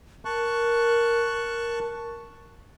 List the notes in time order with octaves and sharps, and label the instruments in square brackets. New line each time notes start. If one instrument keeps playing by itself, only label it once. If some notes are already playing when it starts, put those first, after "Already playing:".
[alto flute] A#4 [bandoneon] A5 C#6 F#6